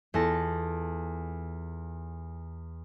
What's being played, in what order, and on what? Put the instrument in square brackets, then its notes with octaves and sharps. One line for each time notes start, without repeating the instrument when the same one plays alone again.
[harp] E2 F4 A4 A5 A#6